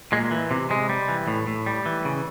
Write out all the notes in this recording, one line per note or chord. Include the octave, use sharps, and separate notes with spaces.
A#2 G#3
E3
C3
C3 G#3
G3
E3
A2
A2
G3
E3
C#3